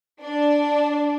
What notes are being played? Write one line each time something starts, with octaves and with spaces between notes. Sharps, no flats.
D4